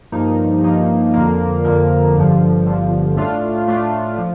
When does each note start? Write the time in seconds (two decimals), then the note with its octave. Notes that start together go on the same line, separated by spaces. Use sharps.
0.12 G2 F3 A#3 D#4
0.63 G2 F3 A#3 D#4
1.14 F2 D3 F3 A#3
1.64 F2 D3 F3 A#3
2.15 G1 G2 D3 F3
2.66 G1 G2 D3 F3
3.17 A2 A3 D4 F4
3.67 A2 A3 D4 F4
4.18 F3